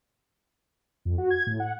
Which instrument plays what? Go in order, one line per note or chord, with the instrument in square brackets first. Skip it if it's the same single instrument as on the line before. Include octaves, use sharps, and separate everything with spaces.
[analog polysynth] F2
F#4
G#6
A2
F#5